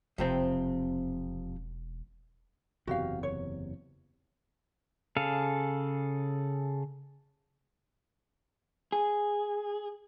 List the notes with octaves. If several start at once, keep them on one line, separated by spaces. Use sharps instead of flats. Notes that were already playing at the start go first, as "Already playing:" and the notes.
E1 F2 C3 C4
F#1 E2 C3 F#4 G4 F5
C#5
C#3 G#4 A4 F5
G#4